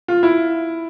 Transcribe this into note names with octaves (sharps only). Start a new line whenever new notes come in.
F4
E4